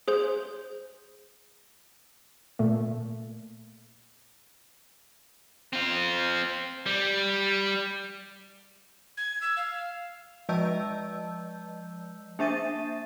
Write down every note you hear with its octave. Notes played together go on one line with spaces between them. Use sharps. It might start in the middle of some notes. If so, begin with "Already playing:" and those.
G#4 C5 G6
A#2 A3
C4 F4
G3
G#6
E6
F5
F3 G#3 D#5 A5 E6 G6
A#3 D4 E5 A6 D#7